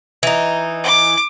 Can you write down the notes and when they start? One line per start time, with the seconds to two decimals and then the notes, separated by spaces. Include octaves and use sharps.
0.23 E3 D#4
0.84 D6